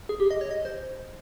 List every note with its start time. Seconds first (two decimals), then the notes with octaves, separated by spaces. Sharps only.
0.09 G#4
0.20 G4
0.31 D#5
0.41 C#5
0.51 D#5
0.65 C5